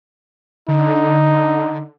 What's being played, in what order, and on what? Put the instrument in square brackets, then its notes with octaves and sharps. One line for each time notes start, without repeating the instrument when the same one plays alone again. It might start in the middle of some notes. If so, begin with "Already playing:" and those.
[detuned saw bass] D3 [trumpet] D#4